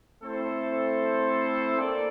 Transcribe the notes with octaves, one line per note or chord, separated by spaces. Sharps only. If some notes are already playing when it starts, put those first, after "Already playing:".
A3 C4 E4 A4 C5
A#3 D4 A4 D5